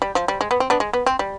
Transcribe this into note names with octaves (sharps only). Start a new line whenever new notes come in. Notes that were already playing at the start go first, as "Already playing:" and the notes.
G3
F3
G3
G#3
B3
C4
B3 D4
G#3
B3
C4
G3